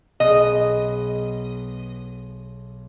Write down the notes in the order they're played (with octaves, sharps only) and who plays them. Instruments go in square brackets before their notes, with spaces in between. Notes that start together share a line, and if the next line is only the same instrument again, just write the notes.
[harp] B1 B3 G#4 [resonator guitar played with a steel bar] D#5